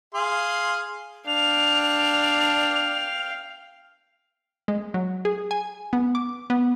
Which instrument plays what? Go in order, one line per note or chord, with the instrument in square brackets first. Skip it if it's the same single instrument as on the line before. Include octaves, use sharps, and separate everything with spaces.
[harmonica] G#4 F5 C6
[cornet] D4 [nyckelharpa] F5 G5 [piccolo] F7
[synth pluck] G#3
F#3
G#4
G#5
B3
D6
B3